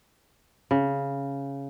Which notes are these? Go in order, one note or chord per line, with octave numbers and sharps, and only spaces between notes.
C#3